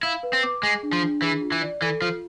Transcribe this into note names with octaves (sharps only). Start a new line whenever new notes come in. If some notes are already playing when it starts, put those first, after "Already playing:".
E4 F5
B4
C4
D6
G#3 G#4
D4
F3
D4
E3 G#4
F4
E3
D5
E3 A4
F3 F4